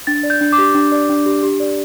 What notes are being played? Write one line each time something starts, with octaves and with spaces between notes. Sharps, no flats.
D4 A6
D5
G6
D4
D6
G4
D4
D5
D4
G4
G4
D5